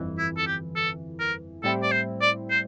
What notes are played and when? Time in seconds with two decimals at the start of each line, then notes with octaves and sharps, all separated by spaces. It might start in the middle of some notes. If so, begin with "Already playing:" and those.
Already playing: G1 F2 E3
0.19 E4
0.38 A4
0.47 G4
0.76 A4
1.20 A#4
1.63 A2 G3 C4 E4 A4
1.83 D5
1.92 C5
2.22 D5
2.51 C5